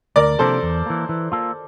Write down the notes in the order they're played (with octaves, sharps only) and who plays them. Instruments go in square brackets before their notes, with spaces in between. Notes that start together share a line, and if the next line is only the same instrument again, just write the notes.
[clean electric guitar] D2 [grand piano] A#4 D5
[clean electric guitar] C3 F3 A#3 D4 [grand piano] A4 C5
[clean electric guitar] E2
E3 A#3
E3
A#3 F4 A4